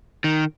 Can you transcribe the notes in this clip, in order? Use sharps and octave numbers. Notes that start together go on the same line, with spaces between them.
D#3